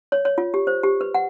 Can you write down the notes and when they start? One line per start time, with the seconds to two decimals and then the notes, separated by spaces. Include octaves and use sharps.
0.12 C#5
0.25 C#5
0.38 F4
0.54 G4
0.67 C5
0.83 G4
1.01 B4
1.14 F#5